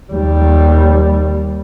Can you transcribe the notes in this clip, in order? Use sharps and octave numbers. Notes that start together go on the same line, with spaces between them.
D#2 G3